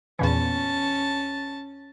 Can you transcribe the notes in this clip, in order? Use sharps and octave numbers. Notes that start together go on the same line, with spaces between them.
E2 A#2 E3 C#4 A5